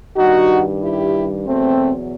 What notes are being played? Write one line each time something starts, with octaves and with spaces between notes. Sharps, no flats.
G2 D#3 G3 D#4 F#4
E4 G4
E2 B2 F#3 A3 C4